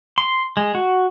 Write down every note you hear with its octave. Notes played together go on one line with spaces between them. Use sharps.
C6
G#3
F#4